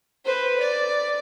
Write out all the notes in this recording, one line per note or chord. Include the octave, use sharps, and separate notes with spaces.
B4 C5
D5